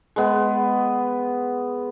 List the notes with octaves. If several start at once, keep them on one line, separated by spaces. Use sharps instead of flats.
G#3 B3